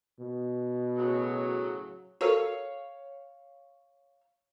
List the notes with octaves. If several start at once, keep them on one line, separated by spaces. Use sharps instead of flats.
B2
A2 C#3 F#3
F#4 A4 A#4 C#5 F5